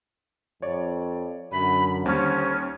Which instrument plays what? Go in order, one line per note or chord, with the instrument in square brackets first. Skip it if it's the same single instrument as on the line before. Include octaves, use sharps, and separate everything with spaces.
[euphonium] F2 [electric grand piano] C#5 D5
[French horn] F#2 [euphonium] D3 [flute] B5
[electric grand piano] D#2 G3 [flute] C#4 [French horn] C5